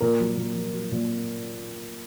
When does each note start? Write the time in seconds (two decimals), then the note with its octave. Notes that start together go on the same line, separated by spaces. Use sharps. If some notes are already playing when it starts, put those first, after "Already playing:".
0.01 A#2 A#4
0.19 F#3
0.37 A#2
0.55 F#3
0.73 F#3
0.92 A#2